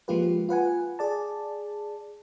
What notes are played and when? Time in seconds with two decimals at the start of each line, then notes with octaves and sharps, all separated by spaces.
0.08 F3 G#3 A#3 F4 G4 B4
0.49 F4 B4 F#5 G#5
0.99 G#4 D5 A5